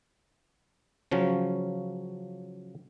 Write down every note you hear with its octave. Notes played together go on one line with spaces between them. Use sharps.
C#3 F3 F#3 C#4